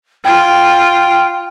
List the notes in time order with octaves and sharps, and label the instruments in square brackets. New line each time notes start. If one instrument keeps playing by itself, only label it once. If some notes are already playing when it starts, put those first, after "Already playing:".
[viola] F4 [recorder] G5